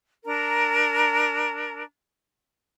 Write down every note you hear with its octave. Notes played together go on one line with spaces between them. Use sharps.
D4 A#4 A#5